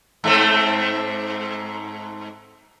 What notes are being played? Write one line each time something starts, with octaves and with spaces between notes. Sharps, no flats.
G#2 A3 C4